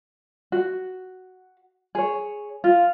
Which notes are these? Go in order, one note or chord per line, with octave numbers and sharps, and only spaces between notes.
F#4
G#4 C#5
F4